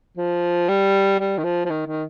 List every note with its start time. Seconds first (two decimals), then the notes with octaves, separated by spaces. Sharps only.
0.17 F3
0.69 G3
1.20 G3
1.38 D#3
1.44 F3
1.65 F3
1.70 D#3
1.86 D#3